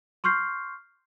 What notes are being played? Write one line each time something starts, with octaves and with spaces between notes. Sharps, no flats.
C6 C#6 F6 G6 C7